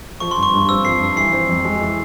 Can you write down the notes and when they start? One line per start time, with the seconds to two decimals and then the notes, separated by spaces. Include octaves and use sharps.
0.20 F3 C#6
0.31 C6
0.37 G2
0.43 C#6
0.53 G2
0.69 C4 E6
0.85 F3 C7
1.01 G2
1.17 E3 C7
1.33 C4
1.49 F2
1.65 G#3
1.81 E3